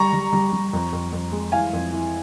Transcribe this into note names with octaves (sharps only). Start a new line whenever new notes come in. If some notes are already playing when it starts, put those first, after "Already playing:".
Already playing: G3 A#5 C#6
G3
G3
G3
F2
F2
F2
G#3
E3 F5 G#5
F2
E3